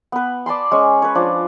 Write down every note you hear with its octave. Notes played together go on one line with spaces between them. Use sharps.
B3 B4
D5 A5 B5 C6
G#3 C#4 C#6
B4 C#5
F3 D4